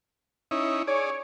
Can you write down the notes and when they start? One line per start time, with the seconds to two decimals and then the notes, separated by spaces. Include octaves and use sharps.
0.51 C#4 D#4 E4
0.87 G#4 C#5 D5